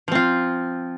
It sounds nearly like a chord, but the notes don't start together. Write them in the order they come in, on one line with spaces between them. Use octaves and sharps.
F3 C4 F4